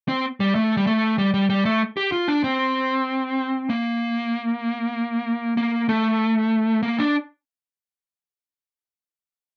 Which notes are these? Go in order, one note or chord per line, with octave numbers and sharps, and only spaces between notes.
C4
G3
A3
G3
A3
G3
G3
G3
A3
G4
F4
D4
C4
A#3
A#3
A3
A#3
D4